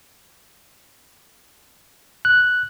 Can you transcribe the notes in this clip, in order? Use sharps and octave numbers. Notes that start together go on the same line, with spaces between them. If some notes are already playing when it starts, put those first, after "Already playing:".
F#6